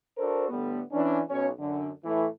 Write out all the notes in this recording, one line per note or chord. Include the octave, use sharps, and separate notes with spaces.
D4 F#4 A4 A#4 C5
A2 D3 G3 B3
E3 C#4 D4
B1 C#4 C#5
F#2 D3
A2 E3 A3